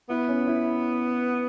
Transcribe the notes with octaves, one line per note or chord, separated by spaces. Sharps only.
B3 E4
C#4
E4